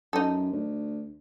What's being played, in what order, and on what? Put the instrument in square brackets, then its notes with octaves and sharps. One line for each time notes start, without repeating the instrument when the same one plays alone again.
[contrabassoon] F#2 [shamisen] D#4 A4
[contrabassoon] D2